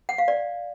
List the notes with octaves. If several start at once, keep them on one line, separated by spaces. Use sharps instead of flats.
F#5
F5
D5